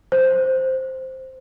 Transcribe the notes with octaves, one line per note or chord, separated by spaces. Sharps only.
C5